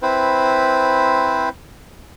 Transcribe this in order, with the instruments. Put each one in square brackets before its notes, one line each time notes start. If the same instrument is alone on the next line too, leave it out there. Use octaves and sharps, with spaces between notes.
[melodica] C4 E4 B4 C5